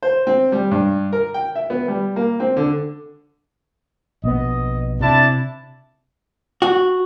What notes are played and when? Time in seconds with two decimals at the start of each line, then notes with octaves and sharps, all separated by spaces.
0.03 C5
0.27 C4
0.52 G3
0.71 G2
1.12 A#4
1.34 G5
1.56 E5
1.70 B3
1.88 G3
2.16 A#3
2.40 C4
2.57 D3
4.24 A#1 B2 B3 D#5
5.01 C3 D4 E4 A5
6.62 F#4